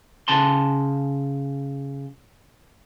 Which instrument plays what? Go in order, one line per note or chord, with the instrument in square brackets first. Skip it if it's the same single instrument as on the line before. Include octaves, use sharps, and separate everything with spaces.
[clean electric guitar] C#3 A5 C6